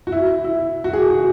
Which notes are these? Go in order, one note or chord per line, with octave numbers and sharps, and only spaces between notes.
F#4
E4
E4
F#4
G#4
F#4